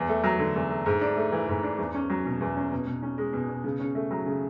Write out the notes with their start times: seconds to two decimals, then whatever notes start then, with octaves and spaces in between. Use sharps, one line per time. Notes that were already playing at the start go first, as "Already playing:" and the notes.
Already playing: E2
0.09 A3
0.24 F#3
0.39 D3
0.56 E2
0.70 A3
0.86 G#2
1.01 D4
1.17 A3
1.32 E3
1.48 G#2
1.63 D4
1.78 E2
1.94 C#4
2.10 F#3
2.26 B2
2.41 E2
2.56 C#4
2.71 B2
2.87 B2
3.02 C#4
3.18 G#3
3.33 B2
3.49 B2
3.64 C#3
3.80 C#4
3.95 A3
4.11 F#3
4.26 C#3